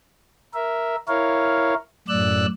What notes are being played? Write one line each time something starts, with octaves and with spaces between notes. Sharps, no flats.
A#4 E5
E4 A#4 C#5 F5
F#2 A2 D5 E6 F#6